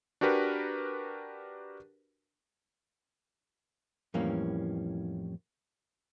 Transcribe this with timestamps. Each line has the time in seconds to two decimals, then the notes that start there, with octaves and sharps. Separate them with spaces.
0.21 D4 F#4 G4 A#4 B4
4.14 F2 A2 E3 G3 A#3 C#4